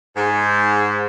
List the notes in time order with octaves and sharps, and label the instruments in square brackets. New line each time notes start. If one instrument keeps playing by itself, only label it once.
[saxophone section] G#2